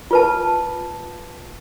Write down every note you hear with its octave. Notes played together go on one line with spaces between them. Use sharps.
F4 B4 A5